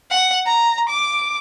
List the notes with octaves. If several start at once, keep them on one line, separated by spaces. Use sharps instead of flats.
F#5
A#5
D6